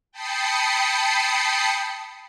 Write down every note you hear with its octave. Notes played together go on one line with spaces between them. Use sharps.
G5 A5 B5 D#6 C7 C#7